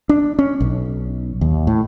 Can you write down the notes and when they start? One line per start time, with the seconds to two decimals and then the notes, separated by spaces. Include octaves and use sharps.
0.09 D4
0.39 C#4
0.60 B1
1.41 D#2
1.67 A2